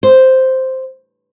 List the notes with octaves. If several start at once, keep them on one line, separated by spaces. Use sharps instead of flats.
C5